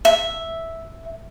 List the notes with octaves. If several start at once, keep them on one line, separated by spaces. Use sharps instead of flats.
E5